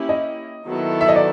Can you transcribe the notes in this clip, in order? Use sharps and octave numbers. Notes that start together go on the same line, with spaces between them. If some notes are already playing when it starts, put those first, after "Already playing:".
Already playing: A#3 C#4 E4 G4
D#5
D#3 F#3 B3 E4 A4
E5
D#5
D5